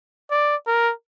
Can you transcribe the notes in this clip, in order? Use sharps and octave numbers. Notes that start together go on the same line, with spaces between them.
D5
A#4